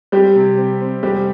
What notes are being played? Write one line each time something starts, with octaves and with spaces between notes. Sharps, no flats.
G3 C4 G4
C3
C4
C4
F1 G3 G4